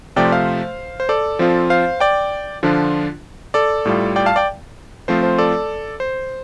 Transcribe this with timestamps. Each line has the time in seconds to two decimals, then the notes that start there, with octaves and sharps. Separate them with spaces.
0.16 C3 F3 A3 D5 G5
0.32 C5 F5
1.00 C5
1.09 A4 D5
1.39 F3 C4 F4
1.70 C5 F5
2.00 D5 G5
2.63 D3 F3 D4 F4
3.54 A4 D5
3.85 A2 G3 F4
4.16 D5 G5
4.26 F5 A5
4.36 D5 G5
5.08 F3 A3 C4 F4 C5
5.23 C5
5.38 A4 D5
6.00 C5